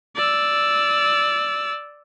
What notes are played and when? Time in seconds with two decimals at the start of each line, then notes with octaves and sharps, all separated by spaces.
0.16 D5 E6